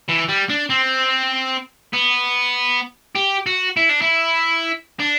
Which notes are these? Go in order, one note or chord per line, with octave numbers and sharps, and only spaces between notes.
E3
G3
D4
C4
B3
G4
F#4
E4
D4
E4
D4